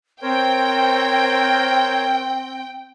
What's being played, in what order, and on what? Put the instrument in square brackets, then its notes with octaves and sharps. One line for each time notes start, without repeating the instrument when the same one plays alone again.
[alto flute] C4 [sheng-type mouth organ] A#4 C5 C#5 [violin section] G5